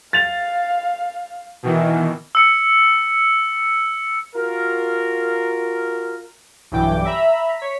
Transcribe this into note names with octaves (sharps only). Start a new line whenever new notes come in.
F5 A6 F7
B2 D#3 E3
E6 C#7
F4 F#4 A#4
B1 G2 E3 G5 D6
E5 A#5 B5
C#5 B6